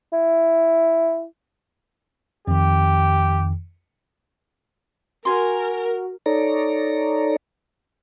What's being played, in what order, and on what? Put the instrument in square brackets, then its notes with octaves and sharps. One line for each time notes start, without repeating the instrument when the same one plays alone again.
[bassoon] E4
[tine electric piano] F2 D#3 [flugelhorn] G4
[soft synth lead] F#4 [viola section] A#4 [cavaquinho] G#5 C6
[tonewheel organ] D#4 A4 C#5 D5 A#5